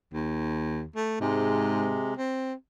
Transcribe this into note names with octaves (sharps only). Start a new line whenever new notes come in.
D#2
A3
G#2 C3 G#3
C4